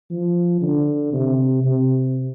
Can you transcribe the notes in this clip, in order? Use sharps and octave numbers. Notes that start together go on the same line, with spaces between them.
F3
D3
C3
C3